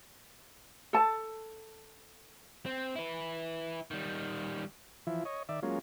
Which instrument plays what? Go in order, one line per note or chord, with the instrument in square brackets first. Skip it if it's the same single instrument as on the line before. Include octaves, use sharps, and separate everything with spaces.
[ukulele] A4 A5
[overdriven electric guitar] C4
E4 B4
D#3 G3
[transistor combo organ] E3 F3 E4
C#5 D#5
D#3 D5 E5
F#3 G#3 A#3 C#4 F4